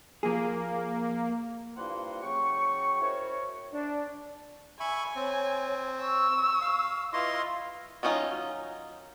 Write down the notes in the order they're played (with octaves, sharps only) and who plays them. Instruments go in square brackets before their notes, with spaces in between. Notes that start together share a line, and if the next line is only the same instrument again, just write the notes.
[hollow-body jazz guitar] F3 G#4 [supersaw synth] A#3
[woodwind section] G2 F3 A#3 E4 F#5 C6
C#3 F#3 G5 C#6
C#4 E4 F#4 A#4 C5 C#5
D4
[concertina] E5 B5 C#6 [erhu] G#5
[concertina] C4 [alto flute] C#5
[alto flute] C#6 [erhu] E6
[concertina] F5
[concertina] E4 D#5 C6 [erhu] F4 [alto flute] B4
[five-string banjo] D#3 F#3 C#4 D#4 F4